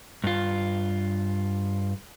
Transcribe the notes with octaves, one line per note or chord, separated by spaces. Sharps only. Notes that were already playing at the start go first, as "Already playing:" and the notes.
G2 F4